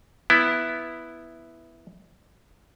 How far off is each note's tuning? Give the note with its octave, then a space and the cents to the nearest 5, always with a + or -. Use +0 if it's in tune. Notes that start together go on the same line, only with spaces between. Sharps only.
B3 +0 E4 +0